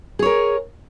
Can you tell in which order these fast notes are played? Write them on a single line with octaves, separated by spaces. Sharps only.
G#4 C#5 A#4